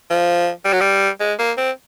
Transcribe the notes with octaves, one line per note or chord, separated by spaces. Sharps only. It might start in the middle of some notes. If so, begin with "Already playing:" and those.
F3
G3
F#3
G3
G#3
A#3
C4